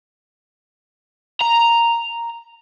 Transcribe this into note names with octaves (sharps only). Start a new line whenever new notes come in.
A#5